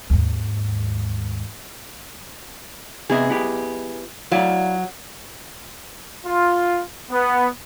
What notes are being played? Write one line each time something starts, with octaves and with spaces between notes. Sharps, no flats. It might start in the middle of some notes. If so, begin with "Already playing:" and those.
D#2 G#2
C3 B3 G#4 D#5 E5
B3 E4 G4
F#3 E4 D5 F5
F4
B3